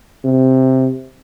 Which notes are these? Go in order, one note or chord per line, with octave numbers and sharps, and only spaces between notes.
C3